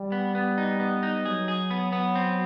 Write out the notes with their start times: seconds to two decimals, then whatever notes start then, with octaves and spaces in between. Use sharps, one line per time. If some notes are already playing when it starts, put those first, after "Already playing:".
Already playing: G3
0.12 B3
0.35 B3
0.58 D#4
0.80 B3
1.03 D#4
1.25 F#3 G#4
1.48 G#4
1.71 B3
1.93 B3
2.15 C4